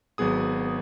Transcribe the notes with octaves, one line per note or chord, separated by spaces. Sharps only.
G#1 F#3 B3 G#4 D#6